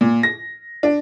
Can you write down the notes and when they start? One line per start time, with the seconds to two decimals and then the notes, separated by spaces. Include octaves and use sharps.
0.01 A#2
0.23 A#6
0.83 D4